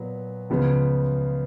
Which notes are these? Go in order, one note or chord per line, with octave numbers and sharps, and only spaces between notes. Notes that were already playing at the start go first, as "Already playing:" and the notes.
Already playing: A#2 F#3 B3
C#2 C#3 F3 B3